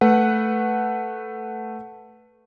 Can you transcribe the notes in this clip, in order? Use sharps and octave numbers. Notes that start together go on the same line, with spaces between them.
A3 B4 F#5